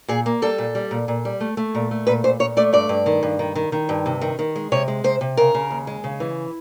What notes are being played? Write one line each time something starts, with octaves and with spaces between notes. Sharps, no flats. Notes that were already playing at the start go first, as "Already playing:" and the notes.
A#2 G#4
A#3
G3 A4
A#2
G3
A#2
A#2
G3
A3
A3
A#2
A3
A#2 B4
A#2 C5
A#2 C#5
A3 D5
G2 D5
G2
D#3
G2
D#3
D#3
D#3
G2
C3
D#3
D#3
G#3
C3 C#5
G#3
C3 C5
C3
C#3 A#4
C#3
D#2
G#3
C#3
E3